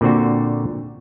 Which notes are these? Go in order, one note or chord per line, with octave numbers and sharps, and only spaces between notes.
A#2 D3 C4 F#4